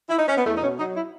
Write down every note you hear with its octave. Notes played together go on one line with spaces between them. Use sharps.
E4
D#4
C#4
B3
E2 A3
D#4
B2 C#4
F#3 D#4
E4